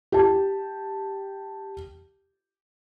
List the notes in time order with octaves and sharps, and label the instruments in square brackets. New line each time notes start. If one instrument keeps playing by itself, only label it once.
[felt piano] G4 A5